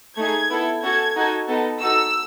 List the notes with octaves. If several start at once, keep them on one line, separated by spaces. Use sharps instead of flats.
A3 D#4 G#4 G#6
B3 E4 A4
C#4 F#4 A4 G#6
D#4 F#4 A4
B3 D#4 A4
D#4 F#4 A4 E6